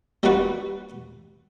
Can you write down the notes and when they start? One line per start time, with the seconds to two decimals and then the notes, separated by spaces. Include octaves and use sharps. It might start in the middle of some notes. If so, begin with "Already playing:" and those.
0.23 G3 A#3 D4 F#4 B4